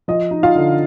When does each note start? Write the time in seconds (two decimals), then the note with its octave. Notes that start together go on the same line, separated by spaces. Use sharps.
0.08 F3 D#5
0.31 D#4
0.43 F4 F5
0.55 D3